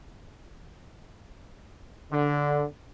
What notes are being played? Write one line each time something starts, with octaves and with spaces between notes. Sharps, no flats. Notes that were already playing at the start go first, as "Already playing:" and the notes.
D3